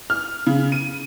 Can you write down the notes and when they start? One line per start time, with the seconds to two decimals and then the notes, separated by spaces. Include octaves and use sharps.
0.10 F6
0.47 C#3
0.72 D#7